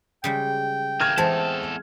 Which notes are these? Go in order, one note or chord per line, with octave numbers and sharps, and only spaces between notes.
C#3 G3 G#3 G5
E3 A#3 F6 G#6
E2 E3 G#3 C4 A4 C5 A5